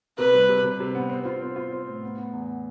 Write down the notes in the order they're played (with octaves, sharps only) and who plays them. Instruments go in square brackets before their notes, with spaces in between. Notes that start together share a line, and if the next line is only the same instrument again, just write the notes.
[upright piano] C3 [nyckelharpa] B4
[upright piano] G3
C3
C3
C3
B3
C4
F4
C4
F4
C4
A2
B3
B3
E2